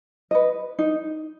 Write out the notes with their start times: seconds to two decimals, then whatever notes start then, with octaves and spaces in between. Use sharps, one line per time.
0.31 B4 D#5
0.79 D#4